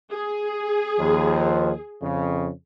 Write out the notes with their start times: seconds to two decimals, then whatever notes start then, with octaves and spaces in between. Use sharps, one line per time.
0.11 G#4
0.98 D#2 F3
2.01 F2 C#3